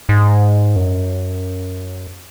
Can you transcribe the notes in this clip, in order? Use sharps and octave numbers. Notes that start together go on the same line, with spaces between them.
G#2
F#2